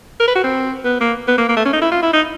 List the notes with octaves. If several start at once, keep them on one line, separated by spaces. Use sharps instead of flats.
A#4
B4
F#4
C4
B3
A#3
B3
A#3
A#3
A3
C#4
D#4
E4
F4
E4
D#4